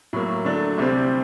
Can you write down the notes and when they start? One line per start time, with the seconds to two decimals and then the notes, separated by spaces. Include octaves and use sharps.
0.13 A2 F#3 A#3
0.45 D3 F#3 A3 D4
0.78 C2 C3 G3 C4